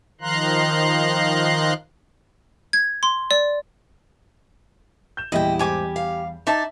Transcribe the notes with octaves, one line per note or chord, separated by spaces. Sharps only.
D#3 F3 F5 A#5 C6 F#6
G#6
C6
D5
G6 E7
E2 A#2 G3 E4 D#5 G5
G#2 G4 G#5 D6
F5
D#4 D5 E5 A5